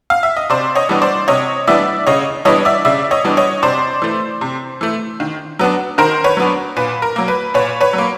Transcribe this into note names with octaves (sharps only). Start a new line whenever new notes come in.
F5
E5
D#5
C3 C5 D5
C#5 D#5
E3 G3 B3 D4
C5 D5
C3 C#5 D#5
E3 G3 B3 D4 D5 E5
C#3 C#5 D#5
E3 G3 B3 D4 C#5 D#5
D5 E5
C#3 D5 E5
C#5 D#5
E3 G3 B3 D4
C#5 D#5
C3 C5 D5
E3 A3
C3
E3 A3
D#3
F#3 B3 D4
D#3 A#4 C5
B4 C#5
F#3 B3 D4
A#2 B4
A#4
F#3 A#3
B4
A#2 B4 C#5
B4 C#5
F#3 A#3